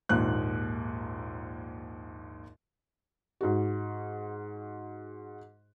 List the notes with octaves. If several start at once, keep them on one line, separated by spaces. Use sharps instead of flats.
A#1 D#2 G#2 F#6
G#2 F#4